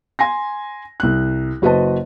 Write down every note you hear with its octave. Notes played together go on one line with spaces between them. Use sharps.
G#5 C6 A#6
C2 F#6
F#1 F#4 B4 C5 D#5 A5